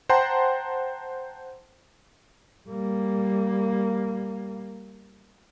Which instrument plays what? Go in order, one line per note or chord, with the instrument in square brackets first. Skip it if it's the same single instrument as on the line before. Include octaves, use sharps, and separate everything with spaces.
[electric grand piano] C5 F#5 G5 A5 A#5 C6
[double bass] G3 A#3